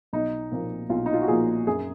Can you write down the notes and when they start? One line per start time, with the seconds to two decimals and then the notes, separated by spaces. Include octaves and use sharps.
0.13 B1 D#4
0.51 A#2 F3 A#3
0.90 B1 F4
1.06 D#4
1.14 F4
1.21 F#4
1.28 A#2 F3 A#3 G#4
1.67 F#2 G#4